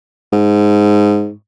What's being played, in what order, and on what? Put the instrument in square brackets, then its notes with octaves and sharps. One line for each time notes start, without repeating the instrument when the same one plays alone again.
[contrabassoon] G#2